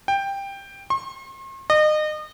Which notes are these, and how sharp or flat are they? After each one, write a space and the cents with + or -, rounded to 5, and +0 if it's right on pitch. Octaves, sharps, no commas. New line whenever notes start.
G5 +10
C6 +45
D#5 -30